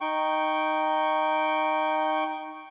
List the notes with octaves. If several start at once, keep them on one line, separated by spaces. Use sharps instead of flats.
D#4 G5 C#6